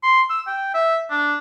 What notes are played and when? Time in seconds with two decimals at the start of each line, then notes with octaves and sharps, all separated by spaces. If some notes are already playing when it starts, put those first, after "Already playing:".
0.03 C6
0.30 E6
0.47 G5
0.74 E5
1.10 D4